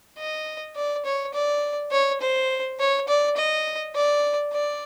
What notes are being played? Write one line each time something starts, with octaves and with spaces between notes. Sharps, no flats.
D#5
D5
C#5
D5
C#5
C5
C#5
D5
D#5
D5
D5